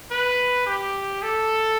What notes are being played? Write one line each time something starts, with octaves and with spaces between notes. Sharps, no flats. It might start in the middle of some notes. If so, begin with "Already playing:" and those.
B4
G4
A4